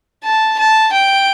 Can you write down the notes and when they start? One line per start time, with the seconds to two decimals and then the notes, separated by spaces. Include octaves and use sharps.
0.24 A5
0.59 A5
0.92 G5